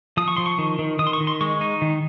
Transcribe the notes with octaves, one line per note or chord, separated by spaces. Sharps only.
F3 D#6
C#6
F3 C6
C#6
D#3
D#3
D#3 D#6
C6
C#6
D#3
C6
G#3 C#6
D#4
D#3